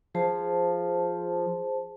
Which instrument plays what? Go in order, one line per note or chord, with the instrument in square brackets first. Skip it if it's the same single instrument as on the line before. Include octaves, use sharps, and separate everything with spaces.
[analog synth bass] F3 [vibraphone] G#4 C5 A5